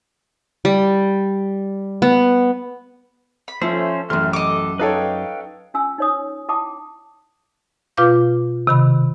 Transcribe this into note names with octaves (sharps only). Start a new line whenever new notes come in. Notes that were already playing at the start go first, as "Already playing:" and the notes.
G3
B3
B5
F3 A3 C#4 C5
A1 F#2 C6 F6
A4 D#5 D6
D#4 A4 B4 C#5 F5 G5
C#4 F4 G#5 E6
D#4 C#5 D#6
E4 G5 A5 D6 D#6
B2 F4 B4 F5 D6 G6
C3 D#3 B5